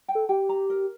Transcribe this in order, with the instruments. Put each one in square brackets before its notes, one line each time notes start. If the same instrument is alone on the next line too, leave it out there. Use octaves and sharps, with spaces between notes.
[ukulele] G5
[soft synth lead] A4
[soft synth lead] G4 [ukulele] G5
[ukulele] A#5
A#4